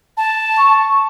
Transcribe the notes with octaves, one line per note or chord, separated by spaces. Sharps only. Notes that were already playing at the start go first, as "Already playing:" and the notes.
A5
C#6